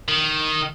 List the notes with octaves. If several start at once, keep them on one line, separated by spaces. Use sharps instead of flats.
D#3